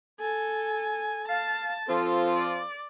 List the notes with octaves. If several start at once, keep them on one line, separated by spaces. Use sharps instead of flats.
A4 G#5
F5 A5
F3 C4 F4 A4
D5